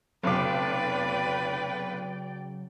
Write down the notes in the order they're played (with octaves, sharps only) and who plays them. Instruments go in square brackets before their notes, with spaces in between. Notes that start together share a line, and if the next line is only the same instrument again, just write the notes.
[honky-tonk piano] F1 B1 D6 [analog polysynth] C#3 F#3 [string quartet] B4 [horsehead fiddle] D5 G5